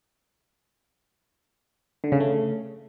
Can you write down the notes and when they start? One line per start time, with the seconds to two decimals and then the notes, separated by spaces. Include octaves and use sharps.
2.04 D3
2.12 C#3
2.20 A3